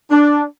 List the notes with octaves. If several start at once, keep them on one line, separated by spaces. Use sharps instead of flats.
D4